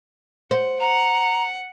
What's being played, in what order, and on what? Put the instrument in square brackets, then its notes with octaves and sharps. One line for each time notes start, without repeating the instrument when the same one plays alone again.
[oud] C5 [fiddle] F#5
[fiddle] F#5 [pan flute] A#5